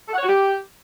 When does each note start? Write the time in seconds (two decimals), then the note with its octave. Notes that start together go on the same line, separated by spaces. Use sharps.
0.08 A4
0.13 F#5
0.18 C#5
0.23 F#4
0.28 G4